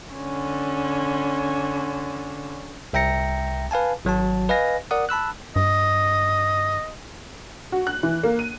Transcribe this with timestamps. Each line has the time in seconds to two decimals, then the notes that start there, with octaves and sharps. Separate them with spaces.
0.13 D3 C#4
2.93 C2 E5 G5 A#5 A#6 C#7
3.71 B4 F5 G#5 A5
4.05 G#1 F#3 F#4 A5
4.49 B4 D#5 F5 G#5 A#6
4.91 A#4 D5 F#5 D#6
5.09 A5 B5 E6 F#6
5.56 G2 D#5
7.72 F#4
7.87 F#6
8.03 E3
8.23 A#3
8.39 D#7